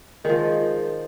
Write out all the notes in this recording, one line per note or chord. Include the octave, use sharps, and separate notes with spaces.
D#3 F3 G#3